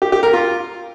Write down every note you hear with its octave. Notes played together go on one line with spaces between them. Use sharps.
G4
G4
A#4
F4